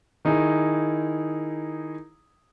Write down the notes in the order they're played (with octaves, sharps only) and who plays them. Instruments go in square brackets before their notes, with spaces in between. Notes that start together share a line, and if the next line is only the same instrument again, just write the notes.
[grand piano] D#3 D#4 E4 G#4